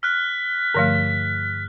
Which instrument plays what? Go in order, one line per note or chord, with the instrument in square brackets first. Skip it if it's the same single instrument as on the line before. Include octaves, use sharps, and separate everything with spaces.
[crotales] F6 F#6 [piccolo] B6
[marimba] G2 [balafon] D3 F3 A3